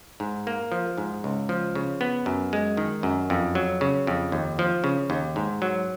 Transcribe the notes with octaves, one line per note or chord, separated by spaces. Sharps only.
G#2
A#3
F3
G#2
C#2
F3
C#3
B3
F#2
G#3
D#3
F#2
F2
F#3
C#3
F2
D#2
F3
C#3
D#2
G#2
F#3